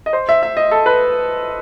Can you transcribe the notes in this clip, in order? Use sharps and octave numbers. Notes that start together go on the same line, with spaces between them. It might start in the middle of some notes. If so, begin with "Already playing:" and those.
D#5
C5
E5
E5
D#5
A4
B4